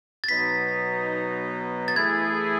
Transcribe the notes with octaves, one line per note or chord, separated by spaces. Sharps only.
A6
B2 F#3 B3 D#4 B6
A6
E3 A3 E4 G#4 G#6